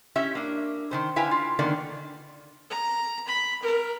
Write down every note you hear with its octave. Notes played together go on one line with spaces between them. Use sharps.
C#4 E4 G4 E5
A#3 D4
D#3 E3 C5
D3 E4 B4 F5 G5 G#5
F4
D3 D#3 A#3 B3 D5
A#5
B5
A#4